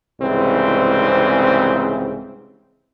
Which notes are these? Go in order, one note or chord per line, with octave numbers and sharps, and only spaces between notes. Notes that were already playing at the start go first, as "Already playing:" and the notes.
C2 G#2 C#3 E3 C4